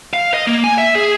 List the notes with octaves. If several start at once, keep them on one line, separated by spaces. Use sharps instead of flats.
F5
D#5
A#3
G#5
E5
G#4